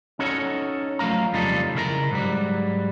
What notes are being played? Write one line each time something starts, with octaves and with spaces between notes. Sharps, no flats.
C#4 D#4 F#4 A4 C#5
F3 F#3 A3 F5 A#5
F2 C#3 F3 G3 D#4 A4
C#3 E4 A#4 D5 A#5
G#2 F#3 G3